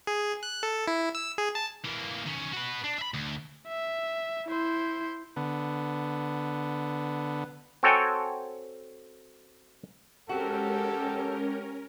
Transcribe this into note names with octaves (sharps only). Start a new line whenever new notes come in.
G#4
F#6
A4
E4
E6
G#4
A5
E3 A#3
D#3 C#4
F#4 B4
D4
E5 B5
D2
E5
E4 C5
D3 B3
C4 F#4 A4 C#5 G5 G#5
G#3 C4 C#4 F#4 G4 A4 A#4